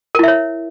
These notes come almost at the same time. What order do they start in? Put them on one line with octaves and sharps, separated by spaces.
A#4 E4 E5 C#5